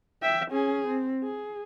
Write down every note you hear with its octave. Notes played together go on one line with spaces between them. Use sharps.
E5 G5
C#4 G#4
C4
G#4